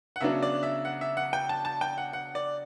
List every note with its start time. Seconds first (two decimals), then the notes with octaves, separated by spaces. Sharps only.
0.16 F#5
0.21 C#3 F#3 B3 D4 E5
0.43 D5
0.63 E5
0.85 F#5
1.01 E5
1.17 F#5
1.33 G5
1.49 A5
1.65 A5
1.81 G5
1.98 F#5
2.13 F#5
2.35 D5